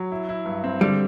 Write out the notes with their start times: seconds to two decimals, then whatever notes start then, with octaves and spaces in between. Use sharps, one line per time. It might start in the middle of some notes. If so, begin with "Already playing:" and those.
Already playing: F#3
0.12 E4
0.29 E4
0.45 G2
0.64 C4
0.81 D3 G3